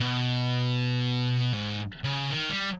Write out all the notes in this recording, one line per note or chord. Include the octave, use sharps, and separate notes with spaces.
B2
G#2
C#3
D#3
G3